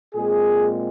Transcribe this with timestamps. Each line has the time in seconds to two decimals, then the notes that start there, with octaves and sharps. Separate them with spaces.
0.14 A#2 G#3 C4 G#4